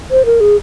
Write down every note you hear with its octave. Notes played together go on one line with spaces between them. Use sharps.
C5
A#4
G#4